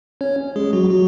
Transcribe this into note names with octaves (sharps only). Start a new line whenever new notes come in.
C#4 C#5
G#3 G#4
F#3 F#4
F#3 F#4